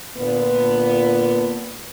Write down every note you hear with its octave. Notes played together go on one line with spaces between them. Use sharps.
A#2 D3 B3